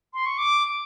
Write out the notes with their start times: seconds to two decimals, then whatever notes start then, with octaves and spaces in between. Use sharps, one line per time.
0.14 C6
0.26 C#6
0.38 D6